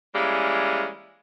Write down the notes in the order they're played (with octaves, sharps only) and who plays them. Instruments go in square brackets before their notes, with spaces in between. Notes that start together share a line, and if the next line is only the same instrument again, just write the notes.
[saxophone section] E3 G3 G#3 A#3 C#4